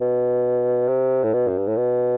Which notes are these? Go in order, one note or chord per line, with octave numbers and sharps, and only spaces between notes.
B2
C3
A2
B2
F#2
G2
A2
B2